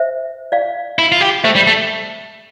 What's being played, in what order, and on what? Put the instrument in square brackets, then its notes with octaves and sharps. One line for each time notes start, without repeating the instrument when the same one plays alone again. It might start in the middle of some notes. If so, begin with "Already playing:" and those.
Already playing: [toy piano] C5 E5
D5 F5
[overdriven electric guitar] E4
F4
G4
[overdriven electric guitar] A3 [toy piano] C5 E5
[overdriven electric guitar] G3
A3